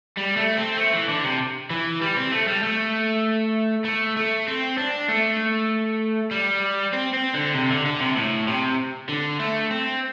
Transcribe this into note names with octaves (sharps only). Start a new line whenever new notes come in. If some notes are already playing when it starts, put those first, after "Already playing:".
G3
A3
C4
A3
E3
D3
C3
E3
G3
C4
A3
G3
A3
A3
A3
C4
D4
A3
G3
C4
C4
D3
C3
D3
D3
C3
A2
C3
D3
A3
C4